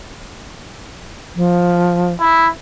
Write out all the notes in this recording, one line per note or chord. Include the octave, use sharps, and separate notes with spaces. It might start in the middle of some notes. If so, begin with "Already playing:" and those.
F3
E4